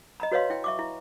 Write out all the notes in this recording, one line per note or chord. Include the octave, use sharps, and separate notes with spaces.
D#5 A#5 B5
F#4 B4 C#5 D#5 F5 C6
E4 G5
E5 C#6 D6
E4